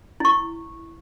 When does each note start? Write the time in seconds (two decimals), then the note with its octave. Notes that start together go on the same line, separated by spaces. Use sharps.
0.20 E4 C#6